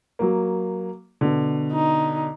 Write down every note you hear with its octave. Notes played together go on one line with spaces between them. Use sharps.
F#3 A#3
B2 D3
D#4